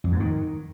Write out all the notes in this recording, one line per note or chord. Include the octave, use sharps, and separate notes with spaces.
F2
G#2
D#3